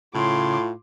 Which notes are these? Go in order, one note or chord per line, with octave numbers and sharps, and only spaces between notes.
A2 C#3 F4 C6 D6